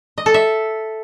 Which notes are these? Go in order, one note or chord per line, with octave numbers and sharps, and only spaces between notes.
D#5
A4
E5